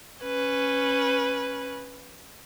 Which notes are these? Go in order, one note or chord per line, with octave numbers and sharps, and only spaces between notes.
C#4 B4